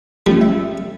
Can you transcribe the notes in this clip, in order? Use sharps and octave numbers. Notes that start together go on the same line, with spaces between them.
F3 G3 A3 C#4
E5